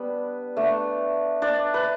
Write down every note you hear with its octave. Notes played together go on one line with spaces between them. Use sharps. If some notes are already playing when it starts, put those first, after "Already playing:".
Already playing: G3 B3 D4 B4
A3 D4
D4 D5
B4